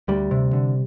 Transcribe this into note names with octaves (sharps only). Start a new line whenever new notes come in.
D2 G3
C3
D3